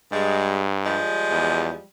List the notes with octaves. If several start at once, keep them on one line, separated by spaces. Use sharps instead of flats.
G2 G3 G#3
F3 G3 G#3
E2